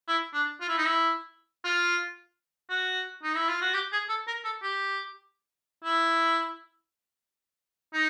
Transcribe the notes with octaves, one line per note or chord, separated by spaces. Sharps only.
E4
D4
F4
E4
D#4
E4
F4
F#4
D#4
E4
F4
F#4
G4
G#4
A4
A#4
A4
G4
E4
D#4